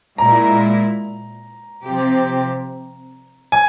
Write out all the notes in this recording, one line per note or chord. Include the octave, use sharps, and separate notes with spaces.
A#2 G#3 E4 A#4 A#5
C3 F3 C4 G4
G#5